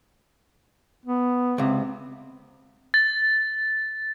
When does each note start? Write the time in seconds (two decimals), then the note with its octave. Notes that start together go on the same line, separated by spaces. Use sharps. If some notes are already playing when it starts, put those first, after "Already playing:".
1.06 B3
1.58 C#2 C3
2.94 A6